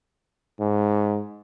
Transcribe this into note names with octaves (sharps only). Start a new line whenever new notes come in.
G#2